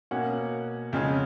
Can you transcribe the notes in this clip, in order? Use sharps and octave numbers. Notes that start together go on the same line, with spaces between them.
B2 A#3 C#4 F#5
F2 C#3 G#3 C#4